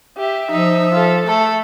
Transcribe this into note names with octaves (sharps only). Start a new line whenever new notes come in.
G4 E5
F3 D#4 E5
F4 A4
A3 A4